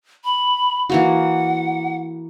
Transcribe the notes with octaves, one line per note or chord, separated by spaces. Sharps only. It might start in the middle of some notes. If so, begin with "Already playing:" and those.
B5
E3 A#3 F#4 F#5